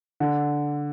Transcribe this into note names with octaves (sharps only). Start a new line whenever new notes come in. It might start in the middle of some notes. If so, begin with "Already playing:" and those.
D3